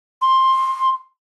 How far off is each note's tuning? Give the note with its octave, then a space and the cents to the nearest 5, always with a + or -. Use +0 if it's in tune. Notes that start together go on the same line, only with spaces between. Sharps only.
C6 +15